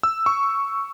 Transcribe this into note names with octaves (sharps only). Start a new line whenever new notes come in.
E6
C#6